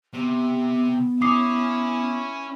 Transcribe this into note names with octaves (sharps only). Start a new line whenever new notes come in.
C3 B3
C#4 E4 D6 D#6 C7